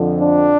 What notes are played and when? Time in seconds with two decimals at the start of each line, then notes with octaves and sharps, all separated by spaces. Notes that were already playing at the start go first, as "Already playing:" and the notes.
Already playing: F2 D3 F3
0.21 D4